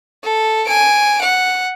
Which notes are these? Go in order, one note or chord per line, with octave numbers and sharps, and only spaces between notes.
A4
G#5 D7
F#5